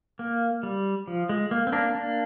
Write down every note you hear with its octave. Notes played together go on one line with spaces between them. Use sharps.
A#3
G3
F3
G#3
A#3
C4
A#3 D4
A#3 D4